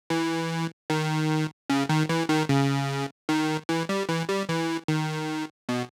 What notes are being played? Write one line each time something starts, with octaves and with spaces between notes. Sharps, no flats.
E3
D#3
C#3
D#3
E3
D#3
C#3
D#3
E3
G3
E3
G3
E3
D#3
B2